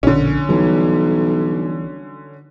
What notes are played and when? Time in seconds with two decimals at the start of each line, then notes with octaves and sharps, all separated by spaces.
0.03 A#1 B2 D3 C#4
0.49 B1 E3 G3